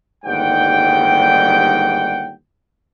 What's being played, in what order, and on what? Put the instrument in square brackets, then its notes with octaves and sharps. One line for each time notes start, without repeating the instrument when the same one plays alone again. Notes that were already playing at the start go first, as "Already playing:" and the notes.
[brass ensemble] G1 D#2 G#2 G3 F#5 G5